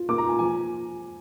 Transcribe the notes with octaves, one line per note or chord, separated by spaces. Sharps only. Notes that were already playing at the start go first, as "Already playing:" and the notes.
Already playing: F4
A#3 D6
A#5
F4 G#5
F3 G#5